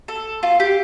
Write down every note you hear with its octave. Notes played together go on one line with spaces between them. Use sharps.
A4
F4
G4